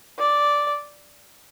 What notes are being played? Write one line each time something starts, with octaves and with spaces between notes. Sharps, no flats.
D5